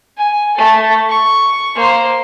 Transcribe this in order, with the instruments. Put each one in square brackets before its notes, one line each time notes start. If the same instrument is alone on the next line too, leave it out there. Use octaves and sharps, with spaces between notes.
[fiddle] G#5
A3 A4
C#6
A#3 C5